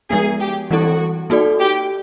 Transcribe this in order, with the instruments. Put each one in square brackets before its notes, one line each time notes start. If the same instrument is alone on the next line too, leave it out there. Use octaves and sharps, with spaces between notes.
[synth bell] F3 G#3 B3 [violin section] G#4
[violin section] G4
[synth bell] E3 G3 C4 E4 A4 [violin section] F#4
[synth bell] A#3 D#4 F#4 A4 D5
[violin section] G4